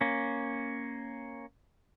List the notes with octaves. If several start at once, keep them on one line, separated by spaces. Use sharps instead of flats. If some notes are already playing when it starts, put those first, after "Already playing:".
A#3 C#4